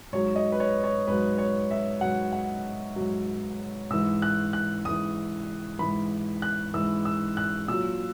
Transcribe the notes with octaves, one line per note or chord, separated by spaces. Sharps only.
G#2 F#3 C#5
D#5
B4
C#5
C#5
G#2 F#3 B4
C#5
E5
G#2 F#3 F#5
F#5
G#2 F#3
G#2 E3 E6
F#6
F#6
G#2 E3 D#6
G#2 E3 B5
F#6
G#2 E3 E6
E6
F#6
A#2 F#3 E6